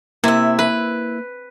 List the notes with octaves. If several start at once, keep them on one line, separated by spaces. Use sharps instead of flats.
C3 A#3 E4 E5
B4